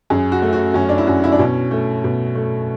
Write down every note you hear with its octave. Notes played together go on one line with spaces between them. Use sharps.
F#2 G#4
F#4
A3
F#4
F#2 C#4
D4
E4
F#2 F#4
E4
D4
B2 C#4
A3
B2
A3